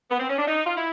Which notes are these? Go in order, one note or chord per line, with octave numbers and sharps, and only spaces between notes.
B3
C4
C#4
D4
D#4
F4
E4